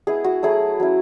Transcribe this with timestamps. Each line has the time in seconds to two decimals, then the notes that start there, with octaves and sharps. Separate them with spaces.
0.07 G#3 B3 E4 G#4
0.24 F#4
0.43 F#3 A3 E4 G#4
0.80 F#3 C#4 E4